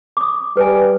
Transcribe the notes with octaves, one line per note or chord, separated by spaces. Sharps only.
D6 D#6
G3 B4 G#5